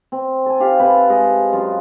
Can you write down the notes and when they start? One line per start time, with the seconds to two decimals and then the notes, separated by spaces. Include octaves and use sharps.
0.12 C4
0.46 A4 G#5
0.60 F4 G4 F5
0.79 C3 A4 B4 G#5
1.09 G#3 D#5
1.53 F#2 F4